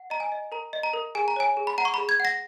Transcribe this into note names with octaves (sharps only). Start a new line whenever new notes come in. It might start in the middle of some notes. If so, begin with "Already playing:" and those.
Already playing: F#5
D#5 A#5
G#5
D#5
A#4 A#5
D#5
A#5
A#4
G#4 G#5
A#5
C#5 G#5
G#4
B5
F#5 A#5
C#6
B5
G#4
G#6
F#5 A#6